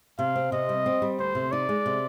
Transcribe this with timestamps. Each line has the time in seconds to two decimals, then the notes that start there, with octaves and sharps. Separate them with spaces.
0.18 C3 F5
0.36 C4
0.52 C3 D#5
0.69 G3
0.86 C4
1.02 G3
1.19 D2 C5
1.35 C3
1.52 D#4 D5
1.69 G#3
1.86 C3